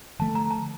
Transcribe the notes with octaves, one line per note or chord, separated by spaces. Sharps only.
D3 F3 A3 A5
A#5
A5